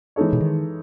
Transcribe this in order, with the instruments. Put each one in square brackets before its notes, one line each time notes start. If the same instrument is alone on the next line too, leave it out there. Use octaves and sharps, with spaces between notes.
[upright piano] E3 G#3 D#4 A4 C#5
[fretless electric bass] B2
D#3